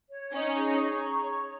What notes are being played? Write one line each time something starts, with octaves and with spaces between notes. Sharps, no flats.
C#5
C#4 D#4
G#4
C#6
A#5
C#5